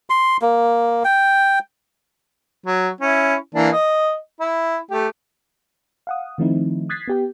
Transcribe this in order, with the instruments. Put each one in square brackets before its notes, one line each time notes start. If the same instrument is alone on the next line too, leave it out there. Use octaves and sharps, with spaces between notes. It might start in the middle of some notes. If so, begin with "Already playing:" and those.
[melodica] C6
A#3
G5
[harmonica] F#3
C#4 E4
E3 A#3 D4
D#5
E4
A3 G4
[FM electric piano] F5 F#5 D#6
D#3 F3 A3 C4 D#4 E4
D#6 F#6 G#6 A6 B6 C7
B3 G4 G5